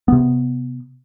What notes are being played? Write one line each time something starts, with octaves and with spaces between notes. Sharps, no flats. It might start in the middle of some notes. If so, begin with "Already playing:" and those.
C3 B3